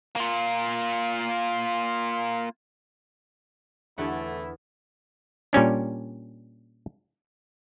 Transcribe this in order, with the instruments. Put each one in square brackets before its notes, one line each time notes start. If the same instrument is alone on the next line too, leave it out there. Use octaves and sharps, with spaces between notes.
[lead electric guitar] A#3 F4
[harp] E2 [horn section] A2 A3 [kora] D3 G4 F#5 [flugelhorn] E4
[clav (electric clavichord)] A#2 G3 C#4 D4